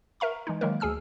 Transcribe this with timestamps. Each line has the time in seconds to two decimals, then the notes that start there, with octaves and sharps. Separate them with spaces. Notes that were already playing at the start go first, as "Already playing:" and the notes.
0.20 A#4 E5 A#5 C#6
0.47 E3 G#3 D#4
0.61 D#3 F#3 G#3 A#3 A#4
0.80 D2 G#4 G#5 E6 F6